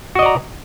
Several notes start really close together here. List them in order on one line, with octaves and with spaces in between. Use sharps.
F#4 D#5 D5 A#5